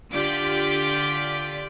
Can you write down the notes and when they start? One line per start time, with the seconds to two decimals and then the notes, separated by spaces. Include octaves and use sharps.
0.11 D3 F4 G4 D5 D6 B6